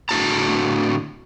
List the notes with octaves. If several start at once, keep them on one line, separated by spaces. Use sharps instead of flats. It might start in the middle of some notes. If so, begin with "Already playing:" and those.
A2 D3 F#4 A5 A#5